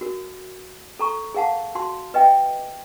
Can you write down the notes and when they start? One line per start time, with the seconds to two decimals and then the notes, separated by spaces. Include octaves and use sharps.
0.01 F#4 A#4
0.99 A4 A#5 C#6
1.34 G#4 A#4 F5 F#5 A5
1.75 F#4 A5 C6
2.14 B4 D#5 E5 G5